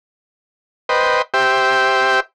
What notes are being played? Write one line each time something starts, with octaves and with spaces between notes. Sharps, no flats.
B4 C5 D#5 G5
G4 C5 E5 G5